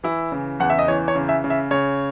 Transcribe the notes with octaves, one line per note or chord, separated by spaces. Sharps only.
E3 E4
C#3
E2 F#5
E5
D#5
E3 C#5
C#5
C#3
E5
C#3
E5
C#3 C#5